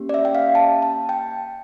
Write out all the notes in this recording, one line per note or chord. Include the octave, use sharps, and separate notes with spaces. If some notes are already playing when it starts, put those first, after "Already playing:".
Already playing: A#3 C#4 G4
D5
E5
G5
F5
A5
A5
G5